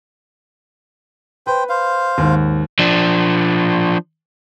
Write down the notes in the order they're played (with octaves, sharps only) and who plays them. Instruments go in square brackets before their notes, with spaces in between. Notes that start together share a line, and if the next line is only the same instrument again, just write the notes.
[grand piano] B4 [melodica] C5 G5
[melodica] C5 F5
[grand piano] D#2 G#2
[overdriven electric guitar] F3 D4